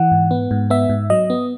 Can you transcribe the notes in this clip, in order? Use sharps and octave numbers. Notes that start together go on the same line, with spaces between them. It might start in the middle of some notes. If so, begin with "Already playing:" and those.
Already playing: E3 F#5
G#2
B3
G#2
B3 E5
G#2
F#3 D#5
B3